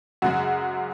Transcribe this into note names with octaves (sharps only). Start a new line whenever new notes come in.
F#2 C#3 G#3 F#4